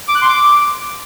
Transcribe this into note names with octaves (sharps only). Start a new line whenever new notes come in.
D6
F#6
C6
D6